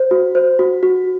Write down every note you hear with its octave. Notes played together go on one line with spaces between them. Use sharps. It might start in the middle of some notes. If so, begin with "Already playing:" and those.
Already playing: C5
F#4
C5
F#4
F#4